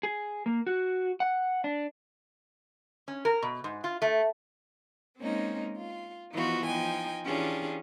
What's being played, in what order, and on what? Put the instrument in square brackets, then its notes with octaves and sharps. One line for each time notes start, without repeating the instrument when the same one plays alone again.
[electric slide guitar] G#4
A#3
F#4
F#5
D4
[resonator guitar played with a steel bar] C#4
A#4
B2
G#2
F4
A3
[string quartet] G#3 A#3 C4 C#4 D#4
F4
E3 F3 B3 D#4 F4 F#4
F3 D#4 G5 G#5
E3 C#4 D4 F4 G4 G#4